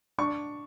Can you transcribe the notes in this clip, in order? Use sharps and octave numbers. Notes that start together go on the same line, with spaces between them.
D4 C#6